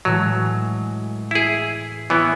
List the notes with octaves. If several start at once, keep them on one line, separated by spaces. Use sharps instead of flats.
A2 E3 F#3 G#3
E4 G#4
E3 B3 C#5 E5 C#6